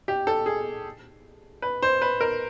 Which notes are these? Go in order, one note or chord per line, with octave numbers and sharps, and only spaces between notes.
G4
A4
G#4
B4
C5
B4
A#4